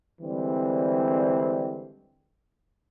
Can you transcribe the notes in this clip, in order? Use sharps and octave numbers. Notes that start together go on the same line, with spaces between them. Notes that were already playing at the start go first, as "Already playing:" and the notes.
D3 E3 G3 G#3 C4